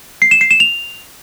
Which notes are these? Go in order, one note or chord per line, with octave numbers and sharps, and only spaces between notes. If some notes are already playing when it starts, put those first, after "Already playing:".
C7
E7
C7
E7
F7